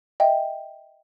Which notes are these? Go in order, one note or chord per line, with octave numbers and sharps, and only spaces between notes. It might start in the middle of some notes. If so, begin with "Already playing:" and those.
D#5 E5 G5